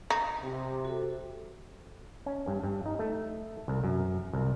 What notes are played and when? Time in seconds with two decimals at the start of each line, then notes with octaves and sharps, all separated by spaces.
0.10 D#4
0.44 C3
0.85 F#4 A4
2.26 C#4
2.48 G2
2.63 G2
2.86 D#4
2.99 A3
3.68 C2
3.84 F#2
4.33 C2